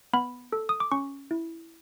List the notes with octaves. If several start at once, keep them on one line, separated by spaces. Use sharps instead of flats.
B3 B5
A4
D#6
D6
C#4 C#6
E4